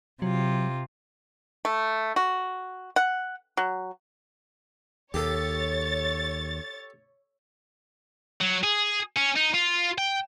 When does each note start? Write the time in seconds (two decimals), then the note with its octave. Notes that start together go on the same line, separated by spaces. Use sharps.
0.22 C3 F#3 F4
1.65 A3
2.16 F#4
2.96 F#5
3.57 F#3
5.14 D#2 G4 A4 C#5 A6
8.41 F#3
8.64 G#4
9.16 C#4
9.36 D#4
9.54 F4
9.98 G5